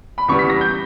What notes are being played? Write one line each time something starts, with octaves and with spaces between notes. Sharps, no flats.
B5
E2 C#3 G3 B3 C#6
B6
A#6
G6